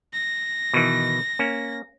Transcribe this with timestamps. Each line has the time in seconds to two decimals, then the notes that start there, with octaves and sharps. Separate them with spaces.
0.13 A#6
0.73 B2 D#3 E3
1.39 A#3 C#4